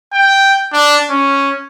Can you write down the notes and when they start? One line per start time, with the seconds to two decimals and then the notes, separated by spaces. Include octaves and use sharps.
0.14 G5
0.73 D4
1.10 C#4